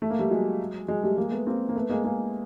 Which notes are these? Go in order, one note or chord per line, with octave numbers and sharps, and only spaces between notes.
A3
A#3
G3 A3
F#3 G#3
F#3 G#3
G3 A3
G#3 A#3
A3 B3
A#3 C4
A#3
A3 B3
G#3 A#3
G#3 A#3